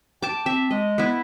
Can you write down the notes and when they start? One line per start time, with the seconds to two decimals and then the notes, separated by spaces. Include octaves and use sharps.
0.22 G5 A5 D6
0.46 C4 E5
0.71 G#3 D#5
0.98 B3 E4